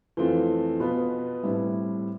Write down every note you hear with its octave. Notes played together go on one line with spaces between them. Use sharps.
F2 E3 A3 C4 F4
B2 B3 F4 B4
A2 G3 C4 E4